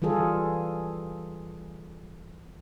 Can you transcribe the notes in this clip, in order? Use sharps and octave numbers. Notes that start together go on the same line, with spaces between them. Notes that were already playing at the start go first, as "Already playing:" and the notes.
E3 G3 F4 G#4 A4